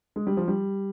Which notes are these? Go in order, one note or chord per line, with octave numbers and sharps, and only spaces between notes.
G#3
G3
F3
G3